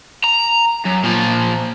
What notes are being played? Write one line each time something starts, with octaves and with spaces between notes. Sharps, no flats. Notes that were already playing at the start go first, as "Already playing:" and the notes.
A#5
F#2
A#2 F3